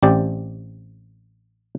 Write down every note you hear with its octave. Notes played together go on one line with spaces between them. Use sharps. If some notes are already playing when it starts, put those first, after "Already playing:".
A1 C4 G4 D5